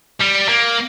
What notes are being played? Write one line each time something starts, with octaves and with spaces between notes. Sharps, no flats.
G3
A#3